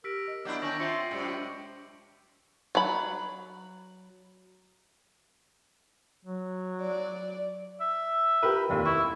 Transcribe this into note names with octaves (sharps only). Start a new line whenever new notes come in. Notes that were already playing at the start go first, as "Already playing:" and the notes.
G4 A#4 E6 B6 D7
D#5
F#3 B3 D4 E4 D6 G6
D#3 C#4 D4 C#6 D6 G6 A#6 F#7
C4 F4 E5 F#5 C6 C#6 C#7
F#2 A2 C3 G#3
F#3 B5
F#3
D5
E5
G4 A#4 B4
F1 D#2
E4 C#6